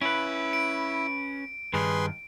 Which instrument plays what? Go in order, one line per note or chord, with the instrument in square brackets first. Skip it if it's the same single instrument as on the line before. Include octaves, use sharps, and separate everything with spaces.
[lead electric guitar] C#4 B4 [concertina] E4 [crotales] D7
[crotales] D7
[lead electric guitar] G2 D#3 [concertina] G#4 B4 C6